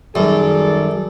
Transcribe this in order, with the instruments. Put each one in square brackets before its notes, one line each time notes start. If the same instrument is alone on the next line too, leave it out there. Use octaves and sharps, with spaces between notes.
[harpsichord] F#2 [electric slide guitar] D#3 G3 [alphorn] G#4 [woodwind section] A4 D5